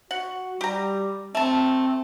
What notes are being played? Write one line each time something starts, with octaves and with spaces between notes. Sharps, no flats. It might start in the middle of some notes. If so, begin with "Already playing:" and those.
F#4 F#5
G3 G4 A#5
A3 C4 A5